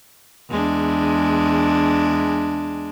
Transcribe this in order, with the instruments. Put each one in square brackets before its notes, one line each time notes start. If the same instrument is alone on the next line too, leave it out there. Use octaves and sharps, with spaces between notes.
[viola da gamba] E2 G#3 D4